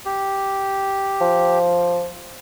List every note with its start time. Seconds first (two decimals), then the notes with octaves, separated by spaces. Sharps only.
0.05 G4
1.21 F3